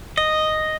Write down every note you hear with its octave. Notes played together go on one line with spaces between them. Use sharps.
D#5